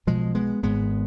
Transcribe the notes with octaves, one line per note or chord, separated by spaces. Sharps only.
B1 B2 F3 G#3
G#3 B3
G#1 G#2 G#3 B3